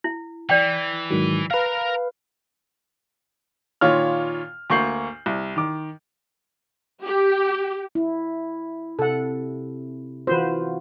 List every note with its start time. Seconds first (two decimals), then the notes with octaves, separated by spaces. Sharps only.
0.04 E4
0.50 E3 D5 G5
1.10 G#2 D#3 F#3
1.51 A#4 B4 F5 A#5
3.81 A#2 D#3 F4 C#5 F6
4.70 D2 A#3 C#6 G6 C7 F#7
5.26 C2
5.56 D#3 D6
7.03 G4
7.95 E4
8.99 C3 A4 F#5
10.27 E3 F4 F#4 B4 C5